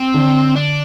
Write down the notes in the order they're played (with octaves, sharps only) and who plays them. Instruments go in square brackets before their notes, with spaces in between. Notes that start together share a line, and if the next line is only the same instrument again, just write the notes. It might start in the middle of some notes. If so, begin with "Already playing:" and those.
Already playing: [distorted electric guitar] C4
[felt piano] D3
[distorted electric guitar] D4